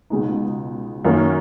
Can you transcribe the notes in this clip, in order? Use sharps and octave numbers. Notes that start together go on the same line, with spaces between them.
C#2 B2 G#3 D#4
F#2 D#3 A#3 C#4